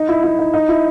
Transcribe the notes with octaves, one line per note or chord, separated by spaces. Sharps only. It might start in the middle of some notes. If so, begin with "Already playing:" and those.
Already playing: D#4
E4
E4
D#4
D#4
E4